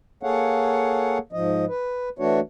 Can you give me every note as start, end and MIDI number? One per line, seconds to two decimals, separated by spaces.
0.23 1.18 58
0.23 1.18 68
0.23 1.18 69
0.23 1.18 73
0.23 1.18 77
0.23 1.18 78
1.32 1.65 44
1.32 1.65 53
1.32 1.65 75
1.68 2.09 71
2.19 2.40 52
2.19 2.40 57
2.19 2.40 62
2.19 2.40 66
2.19 2.40 73